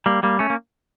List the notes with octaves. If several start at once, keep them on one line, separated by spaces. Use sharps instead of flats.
G3 A#3
G3 A#3
A3 C#4
A#3